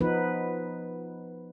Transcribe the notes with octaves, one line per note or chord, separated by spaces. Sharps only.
F3 B3 D#4 B4